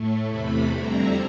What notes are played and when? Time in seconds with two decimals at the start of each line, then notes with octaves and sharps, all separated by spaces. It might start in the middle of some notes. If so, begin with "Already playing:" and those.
Already playing: A2 A3
0.27 E2 C3 E3 A3 B5
0.72 F2 D3 G3 C4 E4 A#5